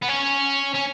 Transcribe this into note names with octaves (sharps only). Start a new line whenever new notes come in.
B3
C#4
C#4